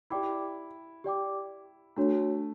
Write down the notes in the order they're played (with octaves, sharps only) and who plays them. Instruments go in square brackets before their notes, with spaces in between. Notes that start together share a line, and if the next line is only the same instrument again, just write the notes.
[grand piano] E4 [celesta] G4 D5 G5 D6
[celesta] G4 D5 G5 D6
[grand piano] A3 [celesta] D4 F#4 C#5